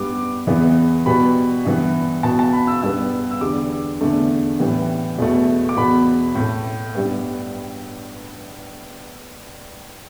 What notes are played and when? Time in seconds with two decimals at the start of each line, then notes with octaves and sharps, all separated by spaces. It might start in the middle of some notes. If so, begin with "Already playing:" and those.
Already playing: G2 G3 B3 D6
0.47 E2 E3 B3
1.06 B2 G3 B3 B5
1.65 G2 E3 B3
2.23 B2 B3 A5
2.39 A5
2.53 B5
2.67 E6
2.82 G2 G3 B3 E6
3.31 E6
3.41 E2 D3 G3 B3 D6
4.01 E2 D3 A3
4.60 A2 E3 G3 B3
5.18 E2 B2 A3
5.69 D6
5.77 E2 B2 B3 B5
6.35 A2 A3
6.95 G2 G3 B3